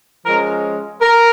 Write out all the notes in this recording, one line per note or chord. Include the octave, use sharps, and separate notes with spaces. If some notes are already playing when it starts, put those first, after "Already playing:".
F3 G#3 C#4 A#4
A#4